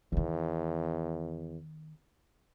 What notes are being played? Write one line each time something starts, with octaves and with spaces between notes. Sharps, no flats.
E2 D#3 B3